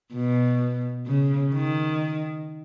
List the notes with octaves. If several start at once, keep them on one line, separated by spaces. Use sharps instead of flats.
B2
C#3
D#3